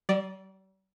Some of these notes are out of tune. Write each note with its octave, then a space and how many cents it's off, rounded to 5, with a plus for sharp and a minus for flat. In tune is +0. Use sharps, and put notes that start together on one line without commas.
G3 -45 D5 +0